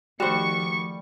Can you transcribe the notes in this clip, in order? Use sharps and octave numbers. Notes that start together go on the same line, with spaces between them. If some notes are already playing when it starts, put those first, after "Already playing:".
D#3 F3 G3 A3 F#4 C5 C#6 C#7